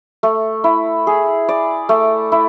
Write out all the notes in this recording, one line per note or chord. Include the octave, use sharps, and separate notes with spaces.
A3
E4
G#4
D5
A3
E4